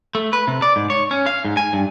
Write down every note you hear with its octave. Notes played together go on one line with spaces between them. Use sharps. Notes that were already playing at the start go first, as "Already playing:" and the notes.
A3
B4
C3
D5
G#2
C#5
C#4
F5
G#2
G#5
G2